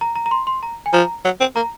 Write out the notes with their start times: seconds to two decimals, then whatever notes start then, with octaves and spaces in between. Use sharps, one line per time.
0.01 A#5
0.15 A#5
0.26 A#5
0.31 C6
0.47 C6
0.63 A#5
0.86 G#5
0.93 F3 A#5
1.24 F#3
1.40 C4
1.56 A#3 A#5